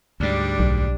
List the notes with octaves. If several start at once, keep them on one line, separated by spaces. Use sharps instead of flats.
D2 G#2 G3 D4
B1